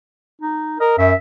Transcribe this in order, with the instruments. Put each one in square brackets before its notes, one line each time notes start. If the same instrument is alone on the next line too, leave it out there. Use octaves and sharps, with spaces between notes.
[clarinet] D#4
[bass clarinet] A#4 [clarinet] D#5
[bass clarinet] F#2 [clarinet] E5